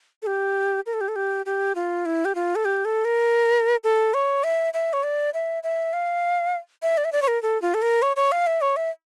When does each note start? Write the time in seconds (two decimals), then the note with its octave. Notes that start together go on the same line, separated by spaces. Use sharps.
0.22 A4
0.27 G4
0.86 A#4
0.93 A4
1.01 G4
1.08 A4
1.16 G4
1.46 G4
1.75 F4
2.05 E4
2.25 G4
2.35 F4
2.55 A4
2.65 G4
2.85 A4
3.05 A#4
3.84 A4
4.14 C#5
4.44 E5
4.74 E5
4.93 C#5
5.03 D5
5.34 E5
5.63 E5
5.93 F5
6.82 E5
6.97 D5
7.05 E5
7.12 D5
7.22 C#5
7.28 A#4
7.42 A4
7.62 F4
7.74 A4
7.82 A#4
8.02 C#5
8.16 C#5
8.32 F5
8.47 E5
8.61 C#5
8.76 E5